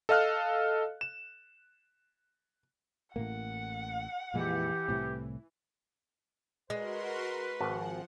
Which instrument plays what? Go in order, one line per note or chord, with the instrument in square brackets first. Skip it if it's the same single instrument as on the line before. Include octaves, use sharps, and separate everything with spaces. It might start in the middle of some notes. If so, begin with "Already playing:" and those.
[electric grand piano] A4 D#5 F5 F6 F#6
E7
[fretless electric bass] A1 A2 A#3 [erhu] F#5
[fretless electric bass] F2 A#2 G#3 [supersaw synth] E3 [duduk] G4
[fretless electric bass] C2 A2 C3
[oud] G#3 [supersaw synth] F#4 A#4 C6 [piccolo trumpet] B4
[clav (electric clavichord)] G#1 F#4 A5 [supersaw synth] F3 F#5